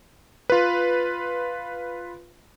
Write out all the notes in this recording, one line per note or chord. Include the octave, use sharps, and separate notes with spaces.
F4 B4